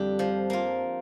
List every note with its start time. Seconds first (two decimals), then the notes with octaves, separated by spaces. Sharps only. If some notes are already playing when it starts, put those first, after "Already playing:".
Already playing: F2 D3 G3 D4 G4
0.19 F3
0.50 A#3 F4